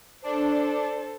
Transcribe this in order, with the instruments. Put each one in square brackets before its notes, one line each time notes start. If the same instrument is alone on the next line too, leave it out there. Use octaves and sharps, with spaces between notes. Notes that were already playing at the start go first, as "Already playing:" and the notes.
[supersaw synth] D4 [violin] A4 C5